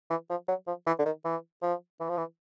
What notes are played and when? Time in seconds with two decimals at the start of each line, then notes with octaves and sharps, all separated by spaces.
0.10 E3
0.30 F3
0.48 F#3
0.67 F3
0.87 E3
0.99 D3
1.05 D#3
1.25 E3
1.62 F3
2.00 E3
2.10 F3
2.18 E3